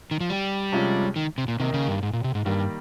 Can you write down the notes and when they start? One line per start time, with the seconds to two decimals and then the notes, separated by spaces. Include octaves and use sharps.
0.11 D#3
0.20 F3
0.30 G3
0.72 C3 F3 G#3 C#4 F4
1.16 D#3
1.38 C3
1.48 A#2
1.59 C3 D#3 A#3 D#4
1.74 C#3
1.88 G2
2.03 G#2
2.13 A#2
2.24 C3
2.35 G#2
2.45 G2 D#3 G3 A#3